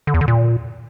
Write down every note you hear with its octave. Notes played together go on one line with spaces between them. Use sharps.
D3
E2
D3
A#2